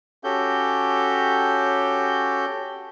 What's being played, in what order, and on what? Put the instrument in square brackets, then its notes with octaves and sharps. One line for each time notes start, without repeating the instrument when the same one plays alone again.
[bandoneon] C#4 F#4 G4 A4 G6